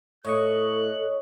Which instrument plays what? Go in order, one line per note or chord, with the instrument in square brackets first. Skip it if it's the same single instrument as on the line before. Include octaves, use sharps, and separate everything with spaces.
[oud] A2 [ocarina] A4 [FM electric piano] C#5 D#5 C#6 [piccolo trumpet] F#6